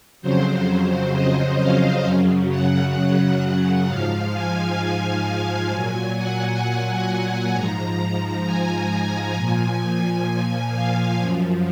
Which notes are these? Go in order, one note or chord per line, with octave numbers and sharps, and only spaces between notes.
F2 C#3 F#3 C5
C5
D#5
F5
F#2 C#3 F#3
F#5
F#5
G#2 F3 F5
G#5
A#2 F#3 G#5
F#5
F#5
G#5
G#2 F3 A#5
G#5
G#5
A#2 F3 G#5
F5
F#2 F3